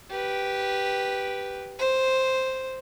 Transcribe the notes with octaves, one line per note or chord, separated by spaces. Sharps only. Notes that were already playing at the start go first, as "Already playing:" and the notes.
G4 B4
C5